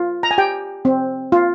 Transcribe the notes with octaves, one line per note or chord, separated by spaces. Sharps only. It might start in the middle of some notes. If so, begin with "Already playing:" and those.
Already playing: F4
A#5
G#5
G4 G5
C4
F4